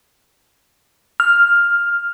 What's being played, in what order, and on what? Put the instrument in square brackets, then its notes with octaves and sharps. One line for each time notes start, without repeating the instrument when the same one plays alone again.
[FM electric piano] F6